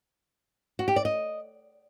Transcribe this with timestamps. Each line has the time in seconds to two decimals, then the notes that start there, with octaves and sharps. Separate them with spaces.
0.79 F#4
0.88 G4
0.96 D5
1.05 D#5